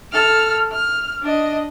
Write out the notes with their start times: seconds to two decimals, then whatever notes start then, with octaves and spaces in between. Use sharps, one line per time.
0.12 A4 F6
0.72 F6
1.22 D4 D#5